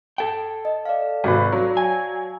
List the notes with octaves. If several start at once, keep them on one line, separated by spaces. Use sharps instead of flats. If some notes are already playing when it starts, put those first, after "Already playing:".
A4 G5
D#5
D5 F5
G#1 C3 B4
F#3
G#5